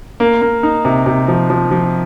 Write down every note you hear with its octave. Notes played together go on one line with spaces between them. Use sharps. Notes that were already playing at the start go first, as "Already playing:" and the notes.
A#3
A#3
D#4
C3
C3
F3
F3
F3